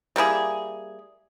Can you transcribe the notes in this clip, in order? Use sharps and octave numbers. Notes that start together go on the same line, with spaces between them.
G3 A#3 E4 G#4